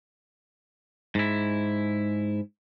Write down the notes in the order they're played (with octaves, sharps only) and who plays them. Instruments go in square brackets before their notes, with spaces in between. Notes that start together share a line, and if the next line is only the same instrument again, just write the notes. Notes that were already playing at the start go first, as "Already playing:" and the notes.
[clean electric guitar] G#2 E4